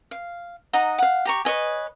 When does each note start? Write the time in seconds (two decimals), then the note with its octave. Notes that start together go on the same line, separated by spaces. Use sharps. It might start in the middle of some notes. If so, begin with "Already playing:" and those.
0.11 F5
0.73 D#4 D#5 F#5 A#5
0.98 F5 F#5
1.25 G4 A#5 C#6
1.45 B4 C#5 D#5 G#5